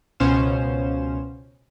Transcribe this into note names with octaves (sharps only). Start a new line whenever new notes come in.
C#2 B2 C#4 C5 F5 E7